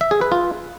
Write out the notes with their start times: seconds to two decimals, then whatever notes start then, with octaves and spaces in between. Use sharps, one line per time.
0.01 E5
0.11 G#4
0.21 B4
0.32 F4